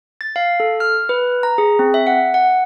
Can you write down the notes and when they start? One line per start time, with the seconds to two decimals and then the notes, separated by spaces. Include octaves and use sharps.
0.21 A6
0.36 F5
0.60 A4
0.80 F6
1.09 B4
1.43 A#5
1.58 G#4
1.79 C4
1.94 E5
2.07 F#5
2.34 F#5